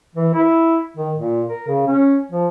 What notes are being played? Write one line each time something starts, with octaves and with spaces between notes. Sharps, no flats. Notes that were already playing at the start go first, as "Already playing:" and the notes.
E3
E4
D#3
A#2
A#4
C#3
C#4
F3